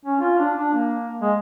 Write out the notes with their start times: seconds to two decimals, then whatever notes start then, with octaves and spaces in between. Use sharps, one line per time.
0.05 C#4
0.20 F4
0.39 D4
0.57 D4
0.74 A#3
1.21 G#3